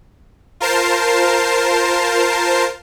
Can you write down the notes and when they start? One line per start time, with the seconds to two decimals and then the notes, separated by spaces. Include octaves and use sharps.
0.60 F4 A#4 C5 A5 C7